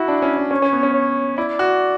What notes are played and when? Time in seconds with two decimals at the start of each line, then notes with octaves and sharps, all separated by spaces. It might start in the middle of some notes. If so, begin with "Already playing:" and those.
Already playing: E4 F#4
0.08 D4
0.22 C#4
0.37 D4
0.51 C#4 C#5
0.62 C#4
0.73 B3
0.83 C#4
0.94 C#5
1.37 E4 D5
1.59 F#4